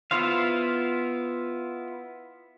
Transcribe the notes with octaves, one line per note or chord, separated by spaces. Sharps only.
B3 E4 F4 C5 F5